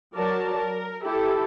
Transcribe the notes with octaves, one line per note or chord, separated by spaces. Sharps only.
F#3 A#4 D5 A5
A#4
E4 G4 A4